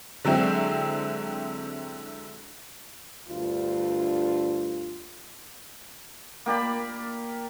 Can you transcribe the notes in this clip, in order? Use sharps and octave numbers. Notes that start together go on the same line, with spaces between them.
D3 F#3 G#3 C4 E4
D2 G2 F4
A#3 G4 D5 B5